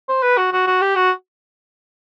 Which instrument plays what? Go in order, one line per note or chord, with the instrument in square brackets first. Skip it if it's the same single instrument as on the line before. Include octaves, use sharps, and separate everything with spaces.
[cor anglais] C5
B4
F#4
F#4
F#4
G4
F#4